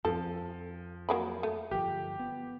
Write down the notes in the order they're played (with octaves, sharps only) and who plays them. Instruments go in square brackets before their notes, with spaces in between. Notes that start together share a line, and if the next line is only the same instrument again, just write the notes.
[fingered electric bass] F2 C4 [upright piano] F3 [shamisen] A4
[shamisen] F#3 A#3 B5
A3
[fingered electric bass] G1 F3 [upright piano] G4
[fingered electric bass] B3